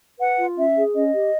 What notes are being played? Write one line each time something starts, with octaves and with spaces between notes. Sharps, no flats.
B4 F#5
F4
C#4 E5
G#4
C#4 D#5
G4